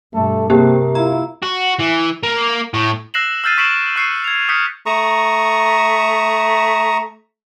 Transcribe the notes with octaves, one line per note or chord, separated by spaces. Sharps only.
G2 B2 A3 A4
C3 A#3 C4 G4 A#4
E4 F4 A#5
F#4
E3
A#3
A2
E6 F#6 A#6 C7 E7 F#7
E6 F6 G6 A6 C7 D#7
C#6 B6 C7 D7 E7 F#7
C#6 F#6 C7 C#7 D#7
G#6 F7
D#6 F6 G6 B6 C#7
A3 A#5 C#6 D#6